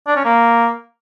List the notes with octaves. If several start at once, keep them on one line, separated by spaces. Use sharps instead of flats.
D4
C#4
A#3